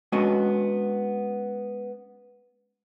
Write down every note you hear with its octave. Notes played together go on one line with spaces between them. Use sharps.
G#3 B3 C#4 D4 F#4 D#5